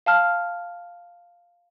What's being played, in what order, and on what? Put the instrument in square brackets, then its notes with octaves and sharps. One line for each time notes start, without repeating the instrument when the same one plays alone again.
[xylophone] F5 A5 F6